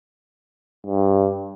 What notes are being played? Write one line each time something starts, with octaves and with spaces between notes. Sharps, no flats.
G2